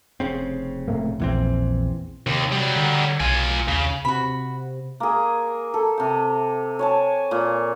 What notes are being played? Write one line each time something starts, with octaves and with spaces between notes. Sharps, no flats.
F1 C#3 C4
A2 A3 A#3
A#1 E2 E3 C4
D#2 C3
F#3 G3
D3
B1 F4 G#5
D#2 C#3
C3 F#4 B5
A#3 G#4
A4
C3 G5
C#5 G#5 A5
A#2